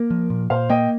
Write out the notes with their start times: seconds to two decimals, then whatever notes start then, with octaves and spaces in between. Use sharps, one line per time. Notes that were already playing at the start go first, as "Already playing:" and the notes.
Already playing: A#3 A#4
0.10 F3
0.30 A#2
0.50 A#2 C5 F5
0.70 A#3 D#5 G5